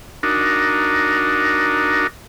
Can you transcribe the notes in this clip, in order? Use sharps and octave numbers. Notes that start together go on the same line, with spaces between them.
D4 D#4 F#4 A#4